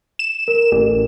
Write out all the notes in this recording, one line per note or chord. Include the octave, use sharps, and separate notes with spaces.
E7
A#4
A1